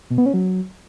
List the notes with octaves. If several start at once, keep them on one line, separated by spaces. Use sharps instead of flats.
B2
B3
C#4
F#3